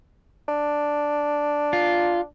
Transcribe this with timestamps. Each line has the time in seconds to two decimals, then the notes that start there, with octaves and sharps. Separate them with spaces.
0.48 D4
1.73 F4